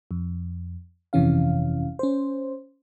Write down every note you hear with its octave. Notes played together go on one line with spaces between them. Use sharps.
F2
G1 F2 C3 E3 C#4 F5
C#4 C5